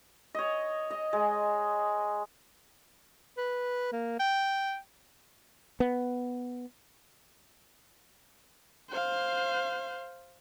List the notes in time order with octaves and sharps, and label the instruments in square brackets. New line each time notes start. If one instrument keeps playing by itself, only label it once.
[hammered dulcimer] C#5 D#5
D#5
G#3
[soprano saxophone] B4
A#3
G5
[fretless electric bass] B3
[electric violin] C5 F5